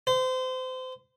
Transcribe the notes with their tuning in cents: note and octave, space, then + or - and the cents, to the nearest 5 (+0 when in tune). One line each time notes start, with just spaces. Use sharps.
C5 -30